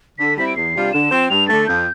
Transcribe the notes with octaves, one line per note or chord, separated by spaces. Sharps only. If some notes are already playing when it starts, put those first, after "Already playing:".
D3 B6
G3 C4 E4 B6
D7
E2 C7
C3 G3 D4 F4
D3 E7
F3 C4
G2 F7
D3 A3 A6
F2 G6